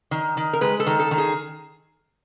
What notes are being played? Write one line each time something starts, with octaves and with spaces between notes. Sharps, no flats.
D#3
D#3
A#4
G#3 B4
A4
D#3
A4
D#3
G#4